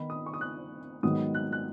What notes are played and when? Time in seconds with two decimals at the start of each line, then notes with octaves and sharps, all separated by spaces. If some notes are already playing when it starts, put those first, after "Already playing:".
Already playing: D#3 B3 D#4 B5
0.10 D#6
0.26 C#6
0.34 D#6
0.41 F#6
1.03 G#2 D#3 F#3 B3 D#6
1.34 F#6
1.52 F#6